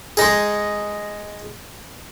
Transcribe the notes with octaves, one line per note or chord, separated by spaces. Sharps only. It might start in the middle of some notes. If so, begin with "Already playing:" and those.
G#3 D#4 G#4